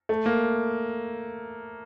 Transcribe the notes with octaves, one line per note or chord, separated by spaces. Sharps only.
A3
A#3